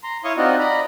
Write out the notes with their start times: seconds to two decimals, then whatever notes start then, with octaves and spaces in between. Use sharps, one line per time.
0.03 A#5 C6
0.24 E4 C#5 F5 C6 C#6 D#6
0.37 C4 D#4 F4 F#4 D5 D#5
0.59 D5 D#5 A#5 B5